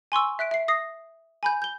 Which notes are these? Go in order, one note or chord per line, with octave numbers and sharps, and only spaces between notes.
G#5 C6 C#6 E6
E5 F#6 B6 D7
E5 C7
D#6 A#6 C7
G#5 B5 G6
G6 G7